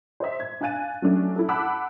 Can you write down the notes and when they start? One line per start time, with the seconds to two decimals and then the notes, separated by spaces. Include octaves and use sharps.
0.20 C5 D#5 E5
0.40 G#6
0.61 D4 F5 G#5 F#6 A6 D#7
1.02 F#3 A3 C#4 D4
1.36 E4 A4
1.49 F#5 A5 B5 D6 E6 F#6